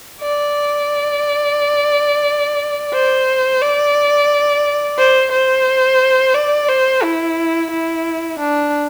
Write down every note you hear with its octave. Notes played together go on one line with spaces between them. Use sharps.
D5
C5
D5
C5
C5
D5
C5
E4
E4
D4